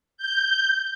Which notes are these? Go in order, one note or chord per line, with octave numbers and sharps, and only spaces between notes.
G6